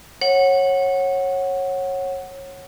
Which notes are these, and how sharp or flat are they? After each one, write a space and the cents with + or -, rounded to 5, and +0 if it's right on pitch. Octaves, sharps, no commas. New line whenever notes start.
C#5 -20 F#5 +0